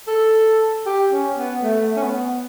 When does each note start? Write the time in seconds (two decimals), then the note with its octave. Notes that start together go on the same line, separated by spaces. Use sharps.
0.07 A4
0.86 G4
1.12 C#4
1.38 B3
1.63 A3
1.96 C#4
2.02 B3